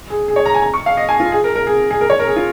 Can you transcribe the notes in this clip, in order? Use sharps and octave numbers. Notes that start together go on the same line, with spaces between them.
G#4
G#4
C#5
A#5
G#5
A#5
C#6
F5
D#5
G#5
F4
G#4
A#4
A#4
G#4
G#4
A#4
C#5
A#4
G#4
F4